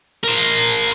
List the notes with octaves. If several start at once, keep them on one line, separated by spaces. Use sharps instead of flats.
A#4 C5